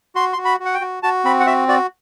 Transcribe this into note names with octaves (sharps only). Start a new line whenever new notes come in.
F#4 C6
C6
F#4
B5
F#4 F#5
G5
F#4
F#4 A5
C4 B5
F#5
F#4 E5
F#4 D5